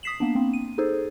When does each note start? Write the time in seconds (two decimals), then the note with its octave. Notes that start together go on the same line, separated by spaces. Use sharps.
0.03 D#6 B6 C7 E7 F#7
0.20 A#3 B3 D4
0.35 A#3 C4
0.53 D#7
0.78 D#4 G#4 A4 C5